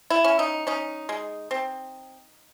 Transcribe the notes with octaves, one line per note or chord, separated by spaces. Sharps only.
E4
C#4
D#4
C#4 D#4
G#3
C4